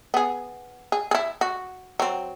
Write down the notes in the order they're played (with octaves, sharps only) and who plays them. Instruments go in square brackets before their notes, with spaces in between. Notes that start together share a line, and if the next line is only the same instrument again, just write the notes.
[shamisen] B3 G#4
G#4
E4 G#4
F#4
F#3 C4